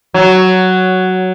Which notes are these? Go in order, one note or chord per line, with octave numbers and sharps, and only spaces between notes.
F#3